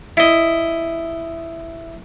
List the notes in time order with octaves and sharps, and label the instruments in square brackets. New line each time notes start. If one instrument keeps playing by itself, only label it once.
[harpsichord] E4 D#5